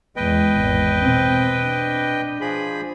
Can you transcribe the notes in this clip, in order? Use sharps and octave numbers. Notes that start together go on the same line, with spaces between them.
E2 G#3 B4 D#5 G5
G#1 E2
B2 C4
D4
F3 G#4 B5